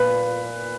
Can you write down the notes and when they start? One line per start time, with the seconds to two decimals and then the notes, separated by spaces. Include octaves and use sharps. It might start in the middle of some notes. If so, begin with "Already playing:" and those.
Already playing: A#2 B4